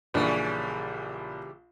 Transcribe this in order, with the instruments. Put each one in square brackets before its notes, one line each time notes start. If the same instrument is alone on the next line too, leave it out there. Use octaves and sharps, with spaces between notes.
[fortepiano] A#1 D4 [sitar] C#3 E3 G3